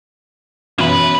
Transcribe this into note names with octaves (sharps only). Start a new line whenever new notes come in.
F#2 B2 E3 A#3 B4